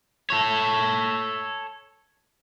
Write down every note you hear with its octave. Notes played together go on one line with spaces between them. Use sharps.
A4 C#5